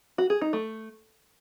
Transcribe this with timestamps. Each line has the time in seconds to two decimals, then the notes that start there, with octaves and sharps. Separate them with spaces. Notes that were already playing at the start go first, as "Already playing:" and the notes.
0.18 F#4
0.30 G#4
0.41 D#4
0.53 A3